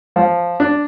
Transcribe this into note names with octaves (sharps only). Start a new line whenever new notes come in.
F3
D4